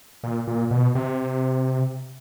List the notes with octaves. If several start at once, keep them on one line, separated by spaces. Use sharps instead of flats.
A#2
A#2
B2
C3